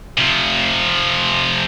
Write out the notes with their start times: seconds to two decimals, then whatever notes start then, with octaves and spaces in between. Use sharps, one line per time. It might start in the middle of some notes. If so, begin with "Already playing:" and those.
0.17 C3 F3